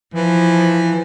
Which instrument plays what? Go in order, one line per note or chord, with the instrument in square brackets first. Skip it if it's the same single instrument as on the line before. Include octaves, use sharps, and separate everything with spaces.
[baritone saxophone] E3 [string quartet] F3